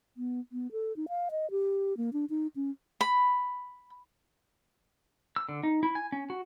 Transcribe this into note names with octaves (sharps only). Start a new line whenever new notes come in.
B3
B3
A4
D#4
F5
D#5
G4
A#3
D4
D#4
C#4
B5
E6
D3
D#4
E4
G#5
C#4
F#4